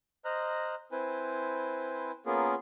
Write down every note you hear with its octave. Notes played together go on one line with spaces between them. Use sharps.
C5 D#5 A#5 F6 F#6
C4 E4 B4 C5 G#5
A#3 B3 C#4 F4 G#4 A#4